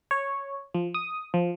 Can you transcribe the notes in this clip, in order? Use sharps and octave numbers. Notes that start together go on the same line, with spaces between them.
C#5
F3
D#6
F3